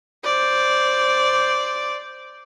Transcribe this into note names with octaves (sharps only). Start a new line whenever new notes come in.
C5 D5